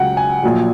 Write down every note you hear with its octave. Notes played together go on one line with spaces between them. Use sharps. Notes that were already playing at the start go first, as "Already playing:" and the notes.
Already playing: C#2 C#3 F#3 F#5 G5
G#5
A#1 A#2 F#3